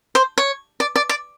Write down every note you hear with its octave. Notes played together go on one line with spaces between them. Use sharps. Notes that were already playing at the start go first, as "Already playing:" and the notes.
C5
C#5
D5
D5
D5